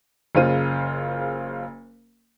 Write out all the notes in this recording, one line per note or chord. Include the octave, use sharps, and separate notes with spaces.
F#1 C#3 F4 C5 D#7